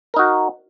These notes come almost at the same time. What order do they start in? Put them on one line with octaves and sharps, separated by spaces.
A#4 D#4 F#4